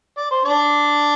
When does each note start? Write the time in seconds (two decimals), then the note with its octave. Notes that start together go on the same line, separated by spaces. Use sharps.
0.17 D5
0.31 C5
0.45 D4 D5